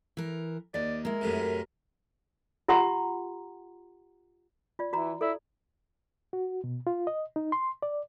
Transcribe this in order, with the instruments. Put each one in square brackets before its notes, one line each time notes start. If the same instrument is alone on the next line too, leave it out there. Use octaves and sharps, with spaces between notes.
[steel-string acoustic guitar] E3 A#4
[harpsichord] D#2 [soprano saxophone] D5 [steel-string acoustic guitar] D#5
[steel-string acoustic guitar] G#3 E4 [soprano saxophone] A#4
[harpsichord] F#2 A2 C3
[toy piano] F4 G4 F#5 A#5 C6
F4 D5
[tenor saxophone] E3 [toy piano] F#4 A#5
[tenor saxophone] E4 [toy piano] A4 D5
[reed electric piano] F#4
B2
F4
D#5
D#4
C6
D5